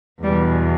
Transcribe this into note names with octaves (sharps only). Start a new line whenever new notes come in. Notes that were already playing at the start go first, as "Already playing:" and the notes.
E2 B2 G3